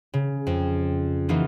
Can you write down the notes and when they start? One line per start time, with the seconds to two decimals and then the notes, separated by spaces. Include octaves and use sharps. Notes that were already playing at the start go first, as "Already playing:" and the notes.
0.14 C#3
0.47 F2
1.29 E3 A#3 D#4 F4 F#4